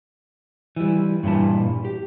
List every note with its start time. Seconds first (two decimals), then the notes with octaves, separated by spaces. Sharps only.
0.76 E3 G3
1.23 G2 A#2 E3 A5
1.85 G4